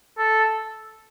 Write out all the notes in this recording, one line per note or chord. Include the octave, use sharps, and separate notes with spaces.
A4